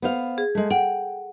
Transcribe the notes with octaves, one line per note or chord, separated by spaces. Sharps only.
B3 C5 F5
G#4
G#3 A3
F#5 G5